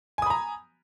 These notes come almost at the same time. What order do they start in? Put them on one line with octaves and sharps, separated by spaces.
G#5 D#6 B5 A#5